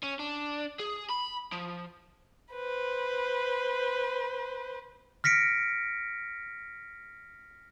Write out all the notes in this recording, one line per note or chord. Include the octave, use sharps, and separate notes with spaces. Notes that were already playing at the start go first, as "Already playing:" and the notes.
C#4
D4
G#4
B5
F3
B4 C5
F6 A#6 B6 C#7 D7